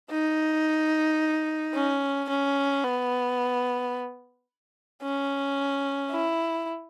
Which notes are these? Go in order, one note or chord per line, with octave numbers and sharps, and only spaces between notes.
D#4
C#4
C#4
B3
C#4
E4